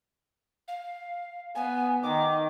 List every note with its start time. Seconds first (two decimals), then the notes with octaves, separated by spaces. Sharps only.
0.68 F5
1.55 B3 G#5
2.03 D#3 D6